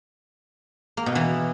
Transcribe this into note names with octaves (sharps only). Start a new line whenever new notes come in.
A#3
B2
E3